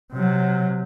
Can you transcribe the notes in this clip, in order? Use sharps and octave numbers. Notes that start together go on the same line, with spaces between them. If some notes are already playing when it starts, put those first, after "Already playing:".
C3 F#3